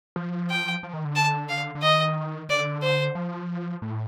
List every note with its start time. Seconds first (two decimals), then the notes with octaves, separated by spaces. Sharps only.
0.16 F3
0.50 G5
0.83 F3
0.93 D#3
1.05 D3
1.15 A5
1.49 F5
1.75 D3
1.82 D#3 D#5
2.49 D3 D5
2.82 C5
3.15 F3
3.82 A2